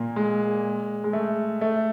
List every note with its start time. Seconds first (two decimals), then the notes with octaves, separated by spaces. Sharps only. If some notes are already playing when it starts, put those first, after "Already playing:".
Already playing: A#2 A#3
0.16 G#3
1.04 G#3
1.13 A3
1.61 A3